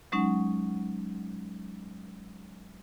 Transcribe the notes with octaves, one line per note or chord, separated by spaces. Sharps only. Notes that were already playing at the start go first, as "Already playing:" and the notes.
F#3 G#3 C#4 D#4 F#5